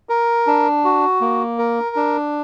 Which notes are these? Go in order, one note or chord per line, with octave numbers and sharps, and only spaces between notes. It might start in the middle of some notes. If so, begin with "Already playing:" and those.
A#4
D4
F#4
A#3
A#4
D4